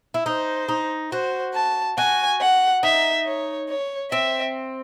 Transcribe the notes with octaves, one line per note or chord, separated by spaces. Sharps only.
E4
D#4 C5
D#4
F#4 C5
A5
F#4 G#5
F#5
D#4 E5
C#5
C#5
C4 E5